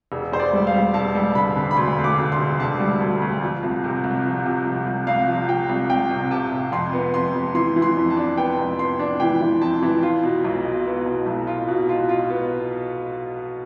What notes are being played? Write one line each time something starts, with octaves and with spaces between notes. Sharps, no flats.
E1
E1 C5
D5
G3
F5
G3
E1 A5
G3
D3 B5
D3
B5
D2 C6
D2
D6
D3
C6
E1
D3 A5
G3
D2
D2
F3
C2
C3
C2
F3
C3
F3
C2
C2 F5
F3
F3 G5
C2
C2 G5
C3
C3 A5
C3
F2 C6
B3
F2 C6
F2
E3 C6
E3
C6
F2
A5
D4
B3 G5
F2
B3 C6
D4
E3 G5
E3
F2 A5
E3
F4 C6
B2
B1
B2
B3
B2
B1
F4
B2
F4
F4
B3